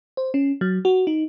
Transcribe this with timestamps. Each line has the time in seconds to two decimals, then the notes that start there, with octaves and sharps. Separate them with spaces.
0.17 C5
0.34 C#4
0.61 F#3
0.85 F#4
1.07 D#4